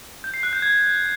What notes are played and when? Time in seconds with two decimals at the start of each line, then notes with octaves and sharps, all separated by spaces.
0.24 G6
0.34 C7
0.43 F#6
0.53 G6
0.62 G#6